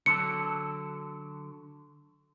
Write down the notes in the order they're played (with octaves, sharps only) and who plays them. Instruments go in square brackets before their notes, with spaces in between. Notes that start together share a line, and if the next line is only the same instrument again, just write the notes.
[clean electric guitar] D3 F#3 A4 [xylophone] C#7